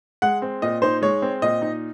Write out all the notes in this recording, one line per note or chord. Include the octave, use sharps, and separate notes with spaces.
G#3 F#5
C4
A#2 D#5
D#4 C5
G#3 C#5
C4
A#2 D#5
D#4